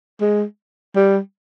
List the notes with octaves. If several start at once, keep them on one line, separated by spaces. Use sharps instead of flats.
G#3
G3